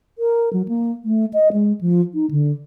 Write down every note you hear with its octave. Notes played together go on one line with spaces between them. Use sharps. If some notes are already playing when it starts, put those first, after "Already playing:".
A#4
F#3
A#3
A3
D#5
G#3
F3
D#4
D3